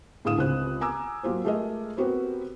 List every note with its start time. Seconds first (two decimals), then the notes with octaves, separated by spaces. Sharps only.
0.25 A2 D3 G#4 F5 D#6 E7
0.38 C#2 C4 G4 F#6
0.81 G#5 A#5 D6 E6
1.23 F#3 A#3 F4 G4 C5
1.44 G#3 A3 F4 G#4 A#4 D#5
1.97 B3 C4 F#4 G4 A#4 C5